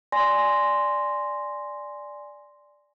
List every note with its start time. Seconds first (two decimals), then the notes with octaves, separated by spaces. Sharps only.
0.12 D5 G#5 C6 A#6